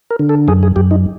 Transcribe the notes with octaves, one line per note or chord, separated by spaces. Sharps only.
A#4
D3
A4
F#2 G#4
G#4
F#2 G4
D#4